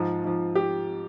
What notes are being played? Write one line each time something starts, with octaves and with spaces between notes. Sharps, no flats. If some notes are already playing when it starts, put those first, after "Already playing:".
Already playing: G#2 F3
G#2 F3
G4